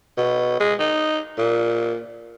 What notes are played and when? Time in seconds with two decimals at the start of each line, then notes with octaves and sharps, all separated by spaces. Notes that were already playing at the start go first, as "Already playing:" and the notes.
0.18 B2
0.60 G#3
0.80 D#4
1.38 A#2